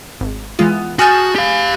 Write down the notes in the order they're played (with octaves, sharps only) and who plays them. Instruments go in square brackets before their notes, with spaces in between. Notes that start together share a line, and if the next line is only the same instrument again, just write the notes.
[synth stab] G#1
[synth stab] E3 G#3 F4 [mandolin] B3
[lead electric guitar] F#4 [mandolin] G#4 A5 [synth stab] D#6 F6 G6
[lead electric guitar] G4 F5